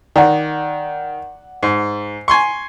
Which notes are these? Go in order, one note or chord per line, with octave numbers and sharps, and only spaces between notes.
D#3 D5 F#5
G#2
G#5 C6 C#6